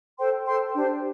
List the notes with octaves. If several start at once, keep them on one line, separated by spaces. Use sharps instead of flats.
A4 C5 G5 C6
A4 C5 G5 C6
D4 G4 C5 G5